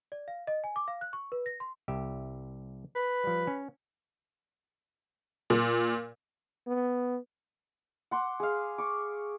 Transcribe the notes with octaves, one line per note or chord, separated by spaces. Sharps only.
D5
F5
D#5
G#5
D6
F5
F#6
C#6
B4
A#6
C6
C2 G4 E5
B4
F3 G3
C#4
A#2
B3
F#5 C6 D6
G#4 F5
C#6 D6